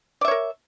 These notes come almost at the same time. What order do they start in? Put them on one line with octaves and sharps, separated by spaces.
D5 E5 C#5 A#4